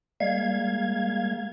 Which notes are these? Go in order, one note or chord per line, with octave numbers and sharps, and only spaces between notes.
G3 G#3 A#3 F5 G#6